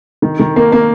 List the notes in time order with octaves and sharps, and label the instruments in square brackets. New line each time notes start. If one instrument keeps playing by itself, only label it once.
[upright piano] D#3
D#3
A#3
A#3